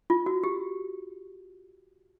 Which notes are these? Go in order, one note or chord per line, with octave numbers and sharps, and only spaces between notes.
F4
F#4
G4